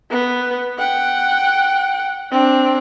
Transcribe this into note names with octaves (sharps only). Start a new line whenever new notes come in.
B3
F#5 G5
C4 D4